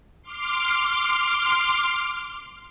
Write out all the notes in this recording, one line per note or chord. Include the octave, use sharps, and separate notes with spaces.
C6 D6 F6